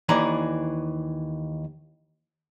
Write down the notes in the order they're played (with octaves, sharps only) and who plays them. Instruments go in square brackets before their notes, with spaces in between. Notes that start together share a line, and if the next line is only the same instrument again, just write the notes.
[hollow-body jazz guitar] D#2 E3 D4 A#5